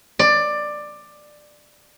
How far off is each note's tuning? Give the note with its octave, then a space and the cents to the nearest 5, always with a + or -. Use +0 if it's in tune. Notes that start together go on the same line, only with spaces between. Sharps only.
D5 +15